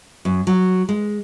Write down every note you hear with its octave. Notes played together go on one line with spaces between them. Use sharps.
F#2
F#3
G#3